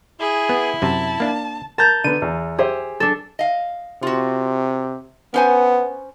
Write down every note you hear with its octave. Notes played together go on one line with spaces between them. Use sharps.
E4 G#4
B3
F#2 C3 A5
A#3 D4
A#4 A5 A#5 G6
D3 B3 D#7
E2
G4 G#4 C5 E5
D4 A4
D#5 F5
C3 F4 F#4
B3 C#4 C5 G#5